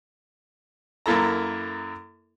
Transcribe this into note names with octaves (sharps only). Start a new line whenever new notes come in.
F#2 A#3 E4 A4 A#5